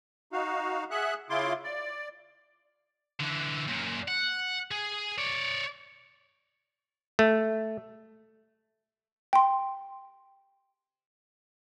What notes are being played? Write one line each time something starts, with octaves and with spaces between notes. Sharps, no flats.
D#4 F#4 F5
G#4 E5 F#5 F#6
C#3 E4 F4 C6 D6
D5
D3 E3
F#2 A#2
F#5
G#4
C#5 D5
A3
G5 C6